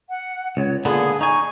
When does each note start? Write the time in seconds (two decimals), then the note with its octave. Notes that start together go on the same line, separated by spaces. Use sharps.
0.09 F#5
0.57 C#2 C#5
0.85 A#2 D3 B3 G#4
1.21 D#4 G#5 C#6